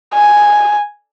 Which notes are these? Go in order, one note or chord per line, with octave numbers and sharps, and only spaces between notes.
G#5